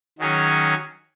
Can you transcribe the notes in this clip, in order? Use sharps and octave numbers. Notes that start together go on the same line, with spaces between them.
D#3 F#3 C#4 G#4 C#5